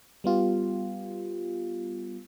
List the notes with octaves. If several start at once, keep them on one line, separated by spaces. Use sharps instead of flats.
G3 B3 F4 G4